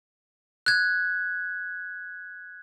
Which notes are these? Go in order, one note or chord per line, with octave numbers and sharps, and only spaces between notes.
F#6 G#6